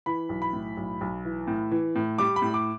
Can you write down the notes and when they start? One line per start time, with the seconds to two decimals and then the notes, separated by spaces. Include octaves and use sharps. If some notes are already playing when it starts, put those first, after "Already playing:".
0.06 E3 B5
0.29 B1
0.42 B5
0.53 A2
0.77 B1
1.01 B1
1.25 E3
1.47 A2
1.71 E3
1.95 A2
2.18 G3 D6
2.36 B5
2.42 A2
2.54 D6